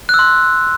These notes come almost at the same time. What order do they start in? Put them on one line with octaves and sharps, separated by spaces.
F#6 E6 C6